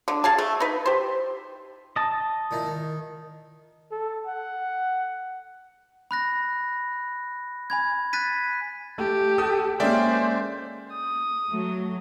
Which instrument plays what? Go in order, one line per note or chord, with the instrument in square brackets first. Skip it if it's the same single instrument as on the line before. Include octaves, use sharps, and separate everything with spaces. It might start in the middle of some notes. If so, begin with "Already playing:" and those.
[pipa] D3
G#4 F5 G#5 A5
A3
D#4 B4
G4 C5
[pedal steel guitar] D#5 A5
[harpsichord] A#2 D#3 E4
D#3
[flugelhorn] A4
F#5
[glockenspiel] B5 F#6 A#6
G#5 B5 G#6
F#6 A6 B6 D#7
[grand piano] A3 [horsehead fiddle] G4
[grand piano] A4 [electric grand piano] D#6 E6
[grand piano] G#3 A#3 C#4 [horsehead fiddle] C5 [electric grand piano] D5 E5 G5
[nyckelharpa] D#6
[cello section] F#3 A3